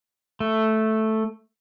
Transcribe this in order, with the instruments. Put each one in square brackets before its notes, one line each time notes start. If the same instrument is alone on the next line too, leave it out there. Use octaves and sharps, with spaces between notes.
[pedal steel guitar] A3